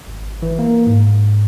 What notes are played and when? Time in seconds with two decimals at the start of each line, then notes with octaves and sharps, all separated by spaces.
0.07 G#1
0.42 E3
0.59 A#3
0.87 G#2